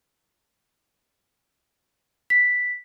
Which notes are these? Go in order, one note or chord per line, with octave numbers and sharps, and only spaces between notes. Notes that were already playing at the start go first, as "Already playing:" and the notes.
B6